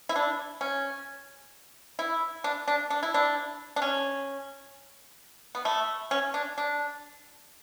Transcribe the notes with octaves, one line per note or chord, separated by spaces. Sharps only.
E4
D4
C#4
E4
D4
D4
D4
E4
D4
D4
C#4
B3
A3
C#4
D4
D4